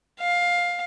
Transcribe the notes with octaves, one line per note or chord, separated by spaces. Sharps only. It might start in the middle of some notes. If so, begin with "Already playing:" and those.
F5